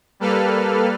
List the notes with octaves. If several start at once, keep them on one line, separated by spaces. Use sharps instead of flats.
G3 A#3 A4 B4 F6